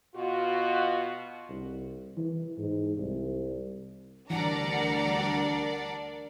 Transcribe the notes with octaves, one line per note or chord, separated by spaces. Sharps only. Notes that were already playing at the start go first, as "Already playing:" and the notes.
B2 F4 F#4
C2
E3
G#2
C2
D2 E3 G3 D4 A#4 D5 F#5 A#5